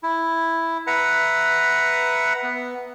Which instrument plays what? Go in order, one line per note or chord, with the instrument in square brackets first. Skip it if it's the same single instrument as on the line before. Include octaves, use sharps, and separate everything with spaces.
[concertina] E4
B4 E5 F#5 A#5
B3